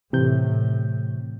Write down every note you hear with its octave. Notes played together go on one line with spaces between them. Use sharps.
A2 C3 E3 G6